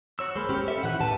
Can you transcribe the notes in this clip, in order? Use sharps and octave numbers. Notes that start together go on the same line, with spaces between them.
F#4 C#5 E6
G#3 A#3 C5 B5 F6
C#4 G4
A4 E5
A#2 E3 F#5 F#6
A2 G4 B4 A5